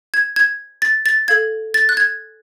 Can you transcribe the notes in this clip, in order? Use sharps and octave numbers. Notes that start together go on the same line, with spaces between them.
G#6
G#6
A6
A6
A4 F5 G#6
A6
F#6
G#6